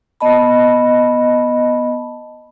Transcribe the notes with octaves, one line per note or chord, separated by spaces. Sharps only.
B3 D#5 A5 B5